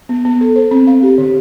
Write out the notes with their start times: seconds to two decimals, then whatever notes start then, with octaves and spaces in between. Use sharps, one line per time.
0.09 B3
0.25 B3
0.41 A4
0.56 C5
0.71 C4
0.87 F5
1.03 G4
1.18 D3